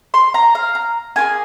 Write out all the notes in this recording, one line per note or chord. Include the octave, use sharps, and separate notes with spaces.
C6
A#5
F5
A#5
A#3 F4 G#4 G#5